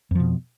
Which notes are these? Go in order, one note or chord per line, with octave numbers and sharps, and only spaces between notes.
F2 B2 F3